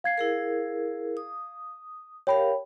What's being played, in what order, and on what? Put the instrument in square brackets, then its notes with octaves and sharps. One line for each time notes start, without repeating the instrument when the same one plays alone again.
[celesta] F5 G#6 C7
[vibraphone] E4 G#4 A#4
D#6
[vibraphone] G4 A#4 F5 [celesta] C#5 G5 B5